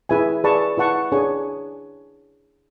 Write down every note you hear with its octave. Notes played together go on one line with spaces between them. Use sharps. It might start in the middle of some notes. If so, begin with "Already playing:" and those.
E4 G#4 B4 E5 G#5
G#4 B4 D5 A5 C#6
E4 B4 F#5 A5 C#6
D4 G#4 C#5 G#5 C#6